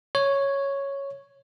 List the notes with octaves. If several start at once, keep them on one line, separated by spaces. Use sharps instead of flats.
C#5